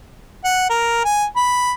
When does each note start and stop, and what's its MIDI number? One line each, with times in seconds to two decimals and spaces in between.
0.44 0.68 78
0.70 1.01 70
1.05 1.25 80
1.36 1.72 83